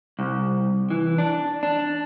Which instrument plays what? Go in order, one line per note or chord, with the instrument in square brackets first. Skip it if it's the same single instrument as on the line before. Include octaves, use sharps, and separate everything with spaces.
[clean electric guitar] C2
E3
D4
D4